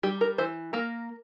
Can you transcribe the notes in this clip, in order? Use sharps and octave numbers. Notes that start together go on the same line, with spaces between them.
G3 G4
A#4
E3 C5
A#3 A#4